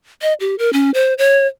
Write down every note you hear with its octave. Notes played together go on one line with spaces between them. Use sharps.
D#5
G4
A#4
C#4
C5
C#5